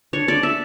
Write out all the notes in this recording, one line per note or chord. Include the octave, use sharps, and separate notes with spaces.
D4 C#5
D4 D5
D4 E5